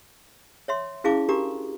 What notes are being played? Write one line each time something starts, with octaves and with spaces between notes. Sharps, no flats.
C#5 E5 C6
C#4 E4 G#4 F5 A5 D6
D4 F#4 G4 A#4 A#5 D6